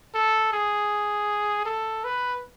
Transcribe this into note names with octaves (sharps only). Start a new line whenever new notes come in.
A4
G#4
A4
B4